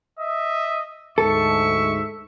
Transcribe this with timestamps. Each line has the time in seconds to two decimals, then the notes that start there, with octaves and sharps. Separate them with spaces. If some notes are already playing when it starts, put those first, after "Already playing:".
0.19 D#5 E5
1.18 D2 G#2 A4 E5 C#6